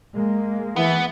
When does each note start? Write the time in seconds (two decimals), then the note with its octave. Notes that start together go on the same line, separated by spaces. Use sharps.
0.14 G#3 A#3
0.76 E3 B3